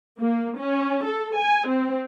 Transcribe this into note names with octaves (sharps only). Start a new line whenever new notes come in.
A#3
C#4
A4
G#5
C4